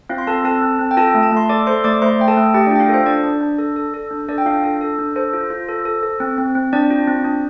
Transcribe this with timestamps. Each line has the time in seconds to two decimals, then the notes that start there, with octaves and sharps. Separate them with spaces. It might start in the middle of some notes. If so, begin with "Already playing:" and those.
0.09 C4 F4 F5
0.18 C6
0.27 C4 A4 A5
0.44 C4 A4 A5
0.62 C4
0.79 C4
0.91 G5
0.97 F4 A4 A5
1.14 A3
1.23 A5
1.32 A3 C6
1.49 A4 D5 D6
1.67 A4 C5 C6
1.84 A3 D5 D6
2.02 A3 C5 C6
2.19 A3 G5
2.28 A4 A5
2.37 A3
2.54 A3 G4 G5
2.67 D4 F4 D5
2.75 G5
2.80 F4 F5
2.89 A4 C5
3.06 D4 D5
3.24 D4
3.41 D4
3.58 A4
3.76 A4
3.94 A4
4.11 D4
4.28 D4 A4 D5
4.38 G5
4.46 D4 F4 F5
4.63 D4 A4
4.81 A4
4.99 D4
5.16 A4 C5
5.33 F4
5.50 F4
5.69 A4
5.85 A4
6.03 A4
6.20 C4
6.38 C4
6.55 C4
6.73 C4 D4 D5
6.90 F4
7.08 C4
7.25 D4